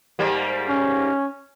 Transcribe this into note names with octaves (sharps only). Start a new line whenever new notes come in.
G#2 G3 A#3
C#4